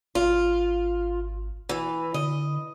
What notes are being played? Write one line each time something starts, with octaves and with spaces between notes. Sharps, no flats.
G#1 F4
E3
D3 D#5